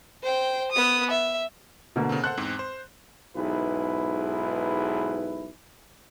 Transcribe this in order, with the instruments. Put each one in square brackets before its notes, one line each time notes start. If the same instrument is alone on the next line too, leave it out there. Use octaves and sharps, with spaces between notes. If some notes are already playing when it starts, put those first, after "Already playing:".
[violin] C5 G5
B3 D#6
E5
[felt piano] B2 D3 A#3
[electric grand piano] C#3 C4
[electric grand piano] A4 C5 F#5 [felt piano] F#6
[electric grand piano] E2 G#2 C4
C5
[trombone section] B1 G#2 E4 G#4 B4